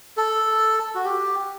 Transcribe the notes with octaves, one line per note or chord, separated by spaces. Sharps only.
A4
F#4
G4